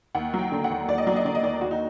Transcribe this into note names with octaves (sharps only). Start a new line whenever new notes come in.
D#2 F#5
F#3
G5
D3
F#5
D#2
D#2 D5
D#5
F#3 D5
D#5
D3 D5
D#5
D#2 D5
D#2 F#4
D#4